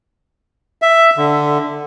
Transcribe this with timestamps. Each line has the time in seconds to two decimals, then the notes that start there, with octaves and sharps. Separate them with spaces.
0.82 E5
1.17 D3